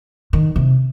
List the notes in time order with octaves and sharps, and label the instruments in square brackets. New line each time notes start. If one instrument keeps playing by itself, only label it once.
[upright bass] D#3
C3